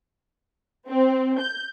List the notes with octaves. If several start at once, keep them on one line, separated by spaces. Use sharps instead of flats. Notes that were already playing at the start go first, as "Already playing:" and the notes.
C4
G6